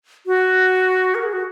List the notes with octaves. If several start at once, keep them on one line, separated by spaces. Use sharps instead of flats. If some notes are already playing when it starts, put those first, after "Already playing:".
F#4
A#4
G#4
F#4